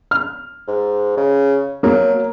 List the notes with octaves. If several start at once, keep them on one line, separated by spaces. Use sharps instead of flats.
F6
G#2
C#3
F#3 A#3